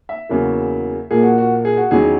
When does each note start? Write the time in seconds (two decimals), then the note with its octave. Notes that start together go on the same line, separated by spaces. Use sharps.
0.09 E5
0.29 E2 C#3 F#3 A#3
1.11 A#1 A#2 A#3 G#4
1.23 F#4
1.38 F#4
1.65 G#4
1.77 F#4
1.91 E2 D#3 F#3 C#4 G#4